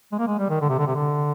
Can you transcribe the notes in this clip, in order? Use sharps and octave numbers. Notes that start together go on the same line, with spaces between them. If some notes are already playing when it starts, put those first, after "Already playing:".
G#3
A#3
G#3
G3
D#3
D3
C3
D3
C3
D3